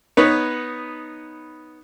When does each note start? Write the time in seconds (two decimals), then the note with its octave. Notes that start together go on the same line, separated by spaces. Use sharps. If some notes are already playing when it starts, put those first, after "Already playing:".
0.17 B3 D#4 B4 C#5